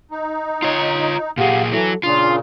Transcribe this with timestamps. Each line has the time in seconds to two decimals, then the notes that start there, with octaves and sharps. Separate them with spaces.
0.11 D#4
0.62 F4 C#5
1.38 A#2 G4 G#4 F5 F#5
1.72 E3 F#3 E4 A4
2.03 A#2 C#3 D4 F4 C6